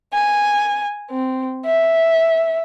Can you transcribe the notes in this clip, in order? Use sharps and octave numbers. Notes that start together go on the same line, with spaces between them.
G#5
C4
E5